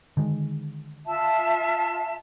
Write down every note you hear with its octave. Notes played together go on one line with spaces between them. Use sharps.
D3 D#3 G#3
F4 E5 A5